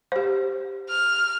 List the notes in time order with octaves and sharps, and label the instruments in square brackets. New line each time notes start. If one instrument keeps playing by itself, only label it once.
[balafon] G4 C5
[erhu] F6